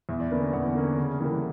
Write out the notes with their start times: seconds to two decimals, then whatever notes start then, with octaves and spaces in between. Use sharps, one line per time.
0.09 E2 E5
0.20 D5
0.31 D3 A#3 C#4 B4
0.43 B4
0.53 E2 F#5
0.75 D3 A#3 C#4
0.98 C#3
1.20 E3 G3 A#3